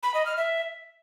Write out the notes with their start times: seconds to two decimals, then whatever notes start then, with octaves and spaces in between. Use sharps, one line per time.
0.03 B5
0.14 D#5
0.26 F6
0.37 E5